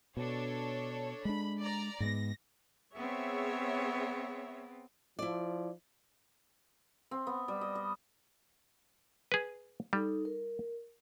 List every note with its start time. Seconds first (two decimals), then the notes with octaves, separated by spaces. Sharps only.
0.17 B2 D4 A4 C#5
1.25 G#3 D4 B5
1.60 D5 A#5
2.00 G#2 G#3 B3 A#6
2.95 B3 C4 G#4 C#5 E5
5.19 F3 E4 D5
7.11 C4
7.27 B3
7.48 G3
7.61 D#5
7.75 D#5
9.32 G#4 B4
9.93 G3 D#4 A4
10.25 A#4